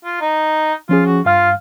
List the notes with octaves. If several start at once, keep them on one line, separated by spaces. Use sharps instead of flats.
F4
D#4
F3 C#4 F4 G#4
F#4
G2 F4 F5 F6